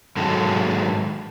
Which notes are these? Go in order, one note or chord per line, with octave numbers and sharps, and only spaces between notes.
G#2 D#3 F#3 G#3 A4